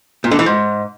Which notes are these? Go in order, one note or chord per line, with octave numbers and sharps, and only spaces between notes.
A#2
D3
E3
G#2